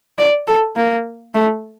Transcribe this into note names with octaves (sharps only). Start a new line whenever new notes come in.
D5
A4
A#3
A3